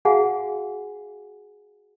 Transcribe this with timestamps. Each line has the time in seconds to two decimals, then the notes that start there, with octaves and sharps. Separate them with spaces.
0.05 F#4 G#4 F5 F#5 G#5